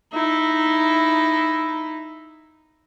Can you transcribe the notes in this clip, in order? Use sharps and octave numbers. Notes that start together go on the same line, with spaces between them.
D#4 E4